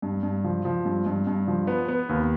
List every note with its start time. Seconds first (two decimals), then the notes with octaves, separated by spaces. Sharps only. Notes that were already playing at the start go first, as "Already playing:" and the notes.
0.02 G2
0.23 G2
0.44 F3
0.65 F3
0.85 G2
1.06 G2
1.27 G2
1.48 F3
1.67 B3
1.88 B3
2.09 D#2